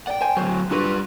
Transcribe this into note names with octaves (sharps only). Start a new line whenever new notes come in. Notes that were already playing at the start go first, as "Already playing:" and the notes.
D5 F#5 G5
C5 G#5
D2 F#3 C5
G3 D4 F4 F#4 B4